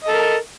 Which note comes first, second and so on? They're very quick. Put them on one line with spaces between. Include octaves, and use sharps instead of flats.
D#5 A4 A#4